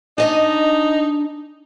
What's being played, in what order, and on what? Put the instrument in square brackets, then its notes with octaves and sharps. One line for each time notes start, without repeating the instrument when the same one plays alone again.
[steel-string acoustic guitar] D4 D#5 G#5 [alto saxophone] D#4